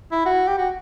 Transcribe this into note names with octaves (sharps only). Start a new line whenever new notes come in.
E4
F#4
G4
F#4